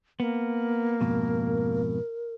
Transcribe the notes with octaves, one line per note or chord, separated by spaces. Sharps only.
A#3 B3
F2 G#2 B2 A#4